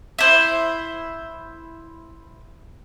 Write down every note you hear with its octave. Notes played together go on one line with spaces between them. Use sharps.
E4 C5